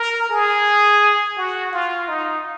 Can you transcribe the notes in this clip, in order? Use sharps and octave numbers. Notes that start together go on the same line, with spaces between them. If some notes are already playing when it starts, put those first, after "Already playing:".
Already playing: A#4
G#4
F#4
F4
D#4